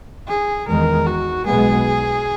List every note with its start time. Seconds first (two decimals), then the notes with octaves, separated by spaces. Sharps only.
0.28 G#4
0.67 E2 D#3 G#3 A#4
1.07 F#4
1.46 B1 B2 G#3 B3 G#4